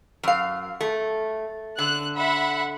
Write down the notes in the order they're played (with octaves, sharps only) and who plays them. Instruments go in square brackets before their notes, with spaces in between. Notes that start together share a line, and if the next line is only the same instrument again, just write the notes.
[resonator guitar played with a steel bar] F#2 F5
A3
[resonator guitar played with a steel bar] D3 [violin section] F#6
[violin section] E5 F#5 B5